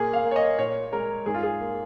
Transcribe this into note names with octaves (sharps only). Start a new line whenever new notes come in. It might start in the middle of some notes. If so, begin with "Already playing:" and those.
Already playing: A#2 A#3 G#4
F5
A#3
C#5
D#5
A#2 C#5
G#3 A#4
G#2 G#4
F4
G#4
A#3